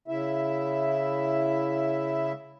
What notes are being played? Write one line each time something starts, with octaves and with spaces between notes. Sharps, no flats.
C#3 E4 E5